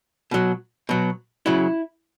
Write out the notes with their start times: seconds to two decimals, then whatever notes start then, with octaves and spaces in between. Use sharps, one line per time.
0.31 B2 F#3
0.89 B2 F#3
1.46 C#3 F#3 E4